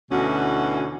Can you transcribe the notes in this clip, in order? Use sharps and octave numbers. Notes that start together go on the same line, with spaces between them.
D2 B2 E3 C#4 F#4